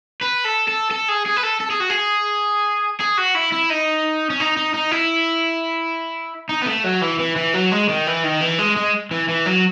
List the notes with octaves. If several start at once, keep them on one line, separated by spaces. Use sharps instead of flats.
B4
A4
A4
A4
G#4
G#4
B4
A4
A4
G#4
F#4
G#4
G#4
F#4
E4
E4
D#4
C#4
D#4
D#4
D#4
E4
D#4
B3
A3
F#3
E3
E3
E3
F#3
G#3
D#3
E3
D#3
E3
G#3
G#3
E3
E3
F#3